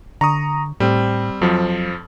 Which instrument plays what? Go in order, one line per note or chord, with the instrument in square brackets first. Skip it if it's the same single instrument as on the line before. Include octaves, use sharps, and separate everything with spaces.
[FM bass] D3 [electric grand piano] A#5 C#6 D#6
[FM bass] A2 [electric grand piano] G3 C4
[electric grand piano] F2 F3 [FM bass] F#3